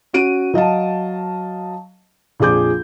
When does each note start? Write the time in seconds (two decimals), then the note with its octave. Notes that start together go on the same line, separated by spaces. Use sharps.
0.13 C#4 F#4 D7 D#7
0.54 F#3 D#5 F5 A5
2.40 A#1 F2 G#4 D6 G6